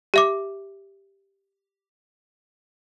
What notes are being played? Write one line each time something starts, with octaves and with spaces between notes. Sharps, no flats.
G4 E5 D6